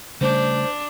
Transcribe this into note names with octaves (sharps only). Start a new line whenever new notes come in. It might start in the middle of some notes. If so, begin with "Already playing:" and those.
C#3 G3 A3 D4 C5